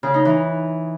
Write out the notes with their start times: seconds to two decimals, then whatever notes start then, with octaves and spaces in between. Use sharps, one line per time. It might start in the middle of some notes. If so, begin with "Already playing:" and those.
0.03 C#3
0.14 D#4
0.25 E3